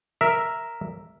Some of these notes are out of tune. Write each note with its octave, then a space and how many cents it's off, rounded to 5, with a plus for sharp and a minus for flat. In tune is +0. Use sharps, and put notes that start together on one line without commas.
A#4 +0 E5 +0